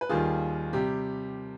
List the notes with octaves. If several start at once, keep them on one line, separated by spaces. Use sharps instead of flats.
B4
D#2 D#3 G3 F4 G#4
C3 G3 G4